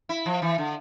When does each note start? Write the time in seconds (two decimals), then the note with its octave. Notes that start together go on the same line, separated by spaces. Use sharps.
0.09 E4
0.26 F3
0.42 E3
0.58 D3